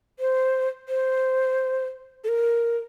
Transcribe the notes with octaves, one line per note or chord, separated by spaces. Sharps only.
C5
C5
A4
A#4